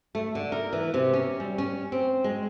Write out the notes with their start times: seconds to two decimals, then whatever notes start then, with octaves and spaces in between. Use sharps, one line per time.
0.15 A3
0.35 D3
0.52 A#4
0.73 E3
0.94 C3
1.13 C#4
1.40 G3
1.58 C#4
1.92 C4
2.24 G#3